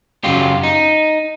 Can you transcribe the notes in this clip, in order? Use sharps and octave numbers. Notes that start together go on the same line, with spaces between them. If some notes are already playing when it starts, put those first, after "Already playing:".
F#2 C#3 F#3 F4 G4
D#4